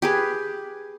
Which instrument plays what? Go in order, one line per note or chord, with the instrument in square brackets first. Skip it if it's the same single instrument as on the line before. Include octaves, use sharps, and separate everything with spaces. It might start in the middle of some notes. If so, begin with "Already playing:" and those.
[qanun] G4 G#4 B4